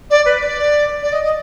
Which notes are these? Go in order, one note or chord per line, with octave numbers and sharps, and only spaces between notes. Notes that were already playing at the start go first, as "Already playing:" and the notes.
D5
B4
D5
D5
D#5
D#5